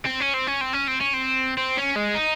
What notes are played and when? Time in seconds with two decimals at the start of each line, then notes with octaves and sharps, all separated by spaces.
0.06 C4
0.21 C#4
0.34 C4
0.47 C#4
0.61 C4
0.73 C#4
0.87 C4
1.01 C#4
1.14 C4
1.57 C4
1.77 C#4
1.96 G#3
2.15 D#4